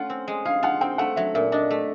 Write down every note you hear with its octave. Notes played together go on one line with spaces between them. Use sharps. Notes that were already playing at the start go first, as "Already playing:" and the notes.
Already playing: A3 C#4 F4 F#5
C4
G#3
G#4 F5
F4 F#5
C4 G5
A3 F#5
F#3 E5
A#2 E5
D4 D#5
A3